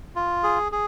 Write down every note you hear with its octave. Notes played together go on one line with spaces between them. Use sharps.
F4
G#4
G#4